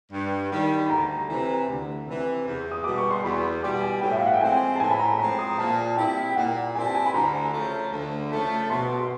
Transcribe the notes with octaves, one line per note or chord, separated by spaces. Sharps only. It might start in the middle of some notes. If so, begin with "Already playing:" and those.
G2
D#3 G3
B5
D2 A#5
C3 E3
D2
C3 E3
E2
D#6
B2 G3 D6
C#6
C6
E2 B5
C6
B2 G3 D6
G#5
A2 G5
E5
F5
F#5
G5
F3 G#3 C4 G#5
A5
A2 G#5
B5
A#5
F3 G#3 C4 A#5
D#6
A#2 A5
G3 C4 E4 G5
G5
A#2 F#5
G3 C4 E4 G#5
A5
G#5
B5
D2 A#5
C#3 F3 A3
D2
C#3 F3 A3
B2 C6
C6